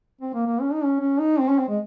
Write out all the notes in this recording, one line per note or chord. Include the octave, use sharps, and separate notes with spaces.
C4
A#3
A#3
C#4
D#4
C#4
C#4
D#4
C4
C#4
C4
G#3